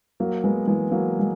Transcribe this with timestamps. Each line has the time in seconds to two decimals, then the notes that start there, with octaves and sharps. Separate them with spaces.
0.20 F#3 A#3
0.44 G#3 B3
0.67 E3 G#3
0.92 F#3 A#3
1.19 G#3